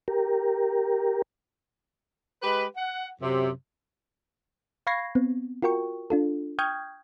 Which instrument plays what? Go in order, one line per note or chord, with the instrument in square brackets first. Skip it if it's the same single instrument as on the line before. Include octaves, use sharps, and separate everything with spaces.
[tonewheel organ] G4 A#4
[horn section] G#3 G4 B4
F#5
F#2 C3
[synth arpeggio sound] F5 B5 C#6 G#6 A#6 C7
B3 C4
F4 F#4 A#4 G5 C#6
D4 F4 A4
G5 C#6 D#6 F6 G6 G#6